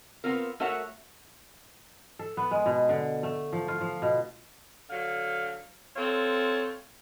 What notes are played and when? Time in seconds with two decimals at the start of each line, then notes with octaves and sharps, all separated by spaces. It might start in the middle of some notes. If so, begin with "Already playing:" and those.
0.24 B3 C4 F4 A#4
0.60 A3 F#4 A#4 C#5 E5 F#5
2.19 A4
2.37 B3
2.51 G#3
2.66 B2
2.89 D3
3.23 A3
3.53 F3
3.68 F4
3.81 F3
4.02 B2
4.90 D3 F#3 F5
5.96 C4 F4 A4 C#5